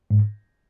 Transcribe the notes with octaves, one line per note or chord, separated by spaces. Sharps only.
G#2